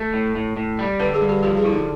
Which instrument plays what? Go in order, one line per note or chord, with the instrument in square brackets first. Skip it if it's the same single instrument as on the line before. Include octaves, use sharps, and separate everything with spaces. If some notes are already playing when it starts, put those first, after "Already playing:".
Already playing: [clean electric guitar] A3
A2
A2
A2
G3
[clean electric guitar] D3 [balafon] B4
[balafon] G#4
[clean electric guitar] G2
[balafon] G4
[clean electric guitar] F3 [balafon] G4
[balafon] G#4
[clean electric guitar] D3 [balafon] E4
[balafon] D#4